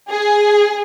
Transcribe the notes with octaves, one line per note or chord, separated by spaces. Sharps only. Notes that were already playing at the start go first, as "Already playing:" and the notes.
G#4